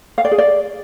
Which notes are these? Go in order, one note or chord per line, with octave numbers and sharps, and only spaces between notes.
F5
D5
G#4
D5